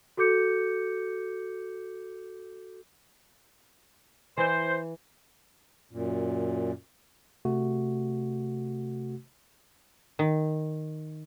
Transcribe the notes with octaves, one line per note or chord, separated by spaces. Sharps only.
F#4 A4 D6 G6 C#7
E3 C5
F#2 A#2
C3 A3 F#4
D#3